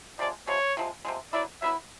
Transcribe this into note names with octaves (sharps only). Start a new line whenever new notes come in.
C3 F3 G#3 D5
C3 F3 G#3 C#5
C3 F3 G#3
C3 F3 G#3
F#3 B3 E4 D5
F#3 B3 E4 E5